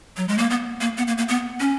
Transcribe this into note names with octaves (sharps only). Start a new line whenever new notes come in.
F#3
G#3
A#3
B3
A#3
B3
A#3
A#3
B3
C#4